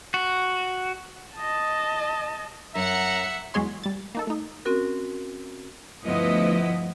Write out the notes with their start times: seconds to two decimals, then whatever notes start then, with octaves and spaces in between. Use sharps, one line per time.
0.14 F#4
1.37 D#5 A5
2.75 F#2 E5 F#5 A#5 C#7
3.54 E2 F#3 G#3 G#4 C#5 C6
3.84 G3 A6
4.15 A#3 D#4 A4
4.27 A3 D#4
4.65 C4 C#4 F#4 A#4
6.04 D2 G2 F3 B3 E4 D#5